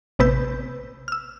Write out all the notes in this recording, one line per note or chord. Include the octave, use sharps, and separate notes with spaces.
A1 C3 B3 B4 E6 G6
E6 F6